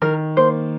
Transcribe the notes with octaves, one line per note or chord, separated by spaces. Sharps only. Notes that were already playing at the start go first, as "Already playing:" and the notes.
D#3 A#4
A#3 C5